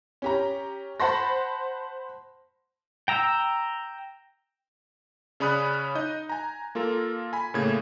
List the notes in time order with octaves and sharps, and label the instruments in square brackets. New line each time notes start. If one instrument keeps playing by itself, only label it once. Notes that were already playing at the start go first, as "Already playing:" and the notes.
[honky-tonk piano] C#4 G4 A#5
C5 F#5 A5 B5 C6 A#6
[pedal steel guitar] G5 A#5 E6
[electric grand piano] C#3 C#4 D5 B5 D#6 F#6
D#4 D#5 G6
G#5 A#5
A#3 F4 A4 A#4
G#5 B5
A2 C#3 A3 A#3 G#6